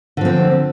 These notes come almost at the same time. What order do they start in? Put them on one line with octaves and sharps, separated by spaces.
D3 F3 C4